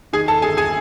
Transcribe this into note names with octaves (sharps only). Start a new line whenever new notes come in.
D#3 G#4 G#5
A4 A5
G1 G#4 G#5
G#4 G#5